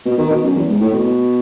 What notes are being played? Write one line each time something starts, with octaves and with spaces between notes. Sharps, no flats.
B2
D#3
B2
F#2
E2
G#2
A2
B2